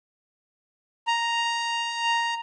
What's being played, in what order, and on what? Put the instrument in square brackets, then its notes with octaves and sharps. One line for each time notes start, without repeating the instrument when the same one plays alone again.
[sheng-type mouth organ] A#5